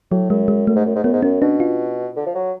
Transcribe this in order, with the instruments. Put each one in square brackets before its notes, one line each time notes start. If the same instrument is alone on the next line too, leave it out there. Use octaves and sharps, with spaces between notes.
[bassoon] A2 [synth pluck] F#3
[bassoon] F#2 [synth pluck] G#3
[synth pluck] G#3
[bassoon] F#2 [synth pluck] A3
[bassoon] G#2
F#2
G#2
[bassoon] F#2 [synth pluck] B3
[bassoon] G#2
[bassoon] F#2 [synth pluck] C#4
[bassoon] B2 [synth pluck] D4
[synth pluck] F4
[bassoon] D3
F3
F#3